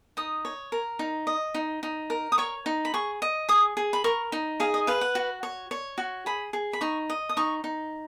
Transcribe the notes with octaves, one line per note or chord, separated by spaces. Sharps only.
D#4 D#6
C#5
A#4
D#4
D#5
D#4
D#4
A#4
D#6
C#5 C#6
D#4
B5
G#4 C#6
D#5
G#4 D#6
G#4
B5
A#4 C#6
D#4
G#4 F5
D#5
B4 F5
F#5
F#4
C#5
C#5
F#4
G#4 B5
G#4
B5
D#4 C#6
D#5
D#6
D#4 C#6
D#4